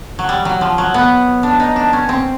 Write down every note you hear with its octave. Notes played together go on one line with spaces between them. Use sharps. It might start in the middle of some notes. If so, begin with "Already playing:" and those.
F#3
G3
F#3
F3
F#3
B3
D4
D#4
D4
C#4
C4